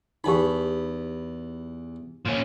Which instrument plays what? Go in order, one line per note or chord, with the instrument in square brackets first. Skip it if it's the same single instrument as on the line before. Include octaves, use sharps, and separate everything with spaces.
[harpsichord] E2 B5 [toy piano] D#4 G4
[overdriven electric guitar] A#2 C#4